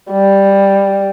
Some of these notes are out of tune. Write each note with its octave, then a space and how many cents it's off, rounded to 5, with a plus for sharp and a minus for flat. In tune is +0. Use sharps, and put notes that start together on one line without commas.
G3 +5